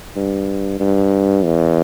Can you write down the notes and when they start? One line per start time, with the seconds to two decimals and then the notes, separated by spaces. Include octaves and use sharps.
0.16 G2
0.80 G2
1.45 E2